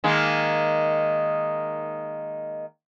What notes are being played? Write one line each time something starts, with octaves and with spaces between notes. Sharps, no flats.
D#3 G#3 A#3